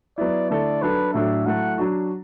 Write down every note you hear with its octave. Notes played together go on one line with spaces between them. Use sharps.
F#3 B3 E4 D5
D3 A3 E4 A4 D5
F#3 D4 A4 B4
A2 F#3 D4 F#4 A4 E5
F#3 A3 E4 A4 F#5
F#3 D4 F#4